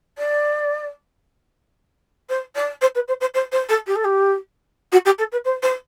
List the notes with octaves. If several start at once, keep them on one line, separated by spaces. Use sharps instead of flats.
D5
C5
D5
C5
B4
C5
C5
C5
C5
A4
G4
A4
G4
F#4
G4
A4
B4
C5
C5